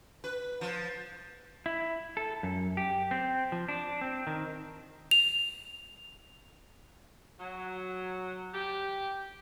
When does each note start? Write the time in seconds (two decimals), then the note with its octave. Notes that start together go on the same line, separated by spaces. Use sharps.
0.24 B4
0.61 F3
1.66 E4
2.17 A4
2.43 F#2
2.77 G4
3.11 C4
3.52 F3
3.69 D4
4.01 C4
4.27 D#3
5.11 F7
7.40 F#3
8.54 G4